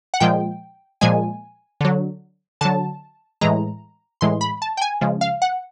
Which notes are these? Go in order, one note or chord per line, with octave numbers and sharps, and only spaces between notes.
F#5
A#2 F3 G#3 G5
A#2 F3 G#3 G#5
D3 F#3
D3 F#3 A5
A2 E3 G#3 A#5
A2 E3 G#3 C6
B5
A5
G5
G#5
C#3 F3 G#3
F5
F#5